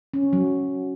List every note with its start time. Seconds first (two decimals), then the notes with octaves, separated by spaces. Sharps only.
0.14 C#4
0.33 F#3